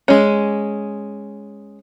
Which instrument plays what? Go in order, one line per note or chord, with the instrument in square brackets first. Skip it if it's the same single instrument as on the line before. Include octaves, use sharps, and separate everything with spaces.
[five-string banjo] G#3 C#4